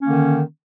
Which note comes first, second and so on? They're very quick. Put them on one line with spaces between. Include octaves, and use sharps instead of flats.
C#4 A#3 D#3 D3